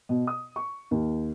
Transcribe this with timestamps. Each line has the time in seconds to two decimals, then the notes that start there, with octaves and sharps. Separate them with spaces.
0.09 B2
0.27 D#6
0.56 C#6
0.91 D#2